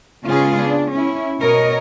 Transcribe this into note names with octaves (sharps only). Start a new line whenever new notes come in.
C#3 G#3 B3 C#4 F4 G#4
D4
C#4 E4
B2 A#4 C#5 D#5